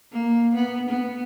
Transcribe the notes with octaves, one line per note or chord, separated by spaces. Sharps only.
A#3
B3
B3